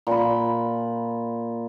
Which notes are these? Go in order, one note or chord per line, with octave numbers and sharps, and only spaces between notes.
A#2 B5